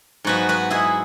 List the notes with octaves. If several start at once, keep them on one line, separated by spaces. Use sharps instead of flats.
G#2 F#3 B3 F#4 B4
F#4 B4
E4 G#4